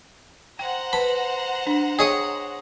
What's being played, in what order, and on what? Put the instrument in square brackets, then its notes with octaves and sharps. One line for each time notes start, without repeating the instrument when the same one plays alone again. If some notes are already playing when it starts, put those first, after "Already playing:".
[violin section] C5 F#5 A#5 [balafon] G5
[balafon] B4 A5 [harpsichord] B5
[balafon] D4
[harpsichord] G#4 C#5 D#6 [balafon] D#5 G5